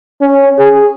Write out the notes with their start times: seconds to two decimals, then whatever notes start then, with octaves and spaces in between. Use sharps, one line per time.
0.21 C#4
0.58 G#4